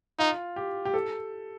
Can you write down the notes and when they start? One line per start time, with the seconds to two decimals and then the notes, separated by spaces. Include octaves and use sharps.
0.19 D#4 F4
0.56 G4
0.85 G4
0.94 A4